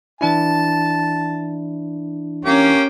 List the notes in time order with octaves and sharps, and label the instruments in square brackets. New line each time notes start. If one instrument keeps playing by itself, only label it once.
[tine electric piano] E3 D4 E4 [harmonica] A5
[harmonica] A#3 G4 [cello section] C#4